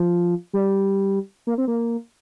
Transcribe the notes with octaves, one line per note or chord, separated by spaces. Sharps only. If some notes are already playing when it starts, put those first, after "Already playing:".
Already playing: F3
G3
A#3
C4
A#3